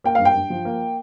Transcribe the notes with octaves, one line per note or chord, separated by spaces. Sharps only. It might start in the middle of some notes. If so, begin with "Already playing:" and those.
A#3 G5
G2 F5
G5
G2
F3
A#3